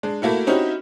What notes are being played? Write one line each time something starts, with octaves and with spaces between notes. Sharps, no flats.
G#3 D4
A3 A#3 E4 F#4
C4 C#4 D#4 E4 F#4 G4